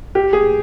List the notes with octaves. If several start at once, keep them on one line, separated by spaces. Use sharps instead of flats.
G4
G#4